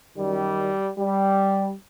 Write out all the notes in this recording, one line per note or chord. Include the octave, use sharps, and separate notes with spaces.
F#2 D#3 G3
G3